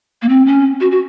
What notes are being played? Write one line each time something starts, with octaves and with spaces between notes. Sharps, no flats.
A#3
C4
C#4
F#4
F#4